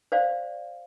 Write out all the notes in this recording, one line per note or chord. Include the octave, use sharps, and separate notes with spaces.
C5 D5 F5